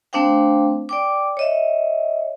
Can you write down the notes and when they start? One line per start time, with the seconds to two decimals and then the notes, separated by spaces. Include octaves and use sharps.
0.13 A3 C4 D4 C5 F5 G5
0.89 D5 G5 D6
1.37 C#5 D#5 E5